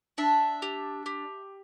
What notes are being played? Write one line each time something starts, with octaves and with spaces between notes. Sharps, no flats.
D4 E5
G4
G4